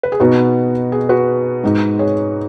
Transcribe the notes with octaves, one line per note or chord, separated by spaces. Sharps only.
B4
G#4
B2 B3 D#4 F#4
G#4
F#4 B4
G#2 G#3 D#4
G#4 C#5